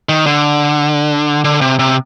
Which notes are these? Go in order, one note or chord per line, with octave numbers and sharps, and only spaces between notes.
D#3
D3
D3
C3
C3